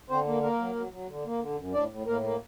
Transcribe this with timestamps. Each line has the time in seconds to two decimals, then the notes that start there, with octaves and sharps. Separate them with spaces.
0.10 D3 C4 C5
0.26 A#3
0.42 A#3 A#4
0.60 F#3
0.75 F#3
0.92 F#3
1.09 D3
1.25 A#3
1.41 D3
1.58 F#2
1.74 A2 D4 D5
1.91 A2
2.07 A2 A#3 A#4
2.24 A#3